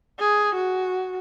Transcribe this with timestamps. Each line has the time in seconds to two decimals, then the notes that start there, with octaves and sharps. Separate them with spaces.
0.19 G#4
0.55 F#4